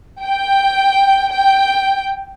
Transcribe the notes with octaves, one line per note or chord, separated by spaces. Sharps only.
G5
G5